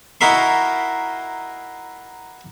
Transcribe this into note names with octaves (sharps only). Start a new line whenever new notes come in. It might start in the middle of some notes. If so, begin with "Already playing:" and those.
D#4 E4 F#4 A#4 E5 C6